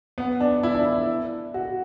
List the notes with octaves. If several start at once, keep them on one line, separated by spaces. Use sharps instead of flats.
B3
D4
E4
D4
E4
F#4